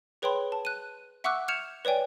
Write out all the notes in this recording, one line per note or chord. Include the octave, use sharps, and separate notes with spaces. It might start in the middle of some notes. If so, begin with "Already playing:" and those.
G#4 B4 C#5 G5 B5 C6
A5
F#6 D#7
E5 F#5 C#6 D6 E6 F#6
F6 G6 G#6 C#7 E7 F7
B4 C#5 D5 G5 G#5